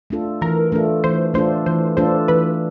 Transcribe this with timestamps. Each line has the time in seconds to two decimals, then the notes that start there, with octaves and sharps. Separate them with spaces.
0.10 A3 D4 F4 A4
0.42 E3 A#4
0.72 A3 D4 F4 A4
1.04 E3 C5
1.34 A3 D4 F4 A4 C5
1.66 E3 C5
1.97 A3 D4 F4 A4 C5
2.28 E3 B4